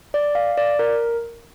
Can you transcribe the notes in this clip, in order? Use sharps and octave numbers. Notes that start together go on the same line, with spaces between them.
D5
F5
D5
A#4